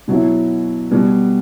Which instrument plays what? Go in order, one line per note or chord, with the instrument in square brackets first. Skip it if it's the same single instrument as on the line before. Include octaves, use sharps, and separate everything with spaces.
[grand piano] B2 F#3 B3 E4
B2 G3 B3